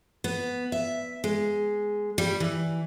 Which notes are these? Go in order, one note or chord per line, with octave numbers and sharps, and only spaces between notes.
B3
E5
G#3
G3
E3